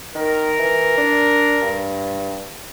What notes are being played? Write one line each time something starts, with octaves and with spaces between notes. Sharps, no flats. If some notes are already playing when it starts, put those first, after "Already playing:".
D#3 A#4
E3
D4
G2